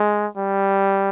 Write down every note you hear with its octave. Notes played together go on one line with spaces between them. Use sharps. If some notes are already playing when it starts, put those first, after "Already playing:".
Already playing: G#3
G3